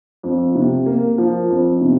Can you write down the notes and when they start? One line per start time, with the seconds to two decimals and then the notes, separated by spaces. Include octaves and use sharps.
0.23 F2
0.55 C3
0.86 A#3
1.18 F3
1.50 F2
1.81 C3